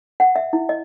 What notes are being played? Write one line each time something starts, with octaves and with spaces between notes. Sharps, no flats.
F#5
E5
E4
D#5